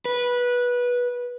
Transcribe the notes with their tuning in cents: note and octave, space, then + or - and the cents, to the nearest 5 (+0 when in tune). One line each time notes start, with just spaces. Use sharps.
B4 -15